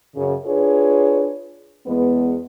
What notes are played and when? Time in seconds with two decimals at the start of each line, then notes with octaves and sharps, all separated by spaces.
0.16 F#2 C#3
0.46 D4 F4 G#4 B4 C#5
1.87 E2 G#3 B3